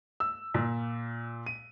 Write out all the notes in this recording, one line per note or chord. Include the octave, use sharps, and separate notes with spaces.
E6
A#2
D#7